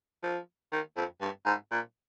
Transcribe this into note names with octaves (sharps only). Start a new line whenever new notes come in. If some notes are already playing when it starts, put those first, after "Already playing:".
F3
D#3
F2
G2
G#2
A#2